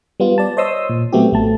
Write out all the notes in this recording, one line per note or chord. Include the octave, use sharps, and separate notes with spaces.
G3 B3 F4
D5 A5
C5 C#5 D#5 C6 D#6 E6
A#2
F#3 A3 B3 C4 F#4 G4
A1 A3 A5